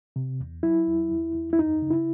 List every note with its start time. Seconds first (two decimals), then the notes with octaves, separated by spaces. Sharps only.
0.16 C3
0.40 E2
0.63 F#3 E4
0.87 E2
1.11 E2
1.35 E2
1.53 E4
1.59 F#2 D#4
1.82 C#3
1.90 E4